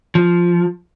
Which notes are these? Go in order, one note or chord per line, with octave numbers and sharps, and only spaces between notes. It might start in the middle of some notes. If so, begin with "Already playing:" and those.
F3